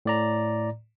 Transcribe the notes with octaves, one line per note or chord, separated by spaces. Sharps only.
A2 D5 A#5